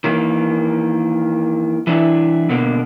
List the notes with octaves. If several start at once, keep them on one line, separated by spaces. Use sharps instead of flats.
D#3 E3 A#3
E3 D4 E4
B2 D3 A#3